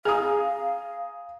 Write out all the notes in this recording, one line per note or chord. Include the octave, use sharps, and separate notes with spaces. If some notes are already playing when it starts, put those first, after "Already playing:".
G#4 F5 G#5 A#5 D#6